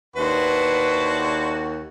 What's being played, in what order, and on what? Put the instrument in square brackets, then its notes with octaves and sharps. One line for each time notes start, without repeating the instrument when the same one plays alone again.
[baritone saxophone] D#2 [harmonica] D4 E4 C5 [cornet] F#4 [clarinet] B4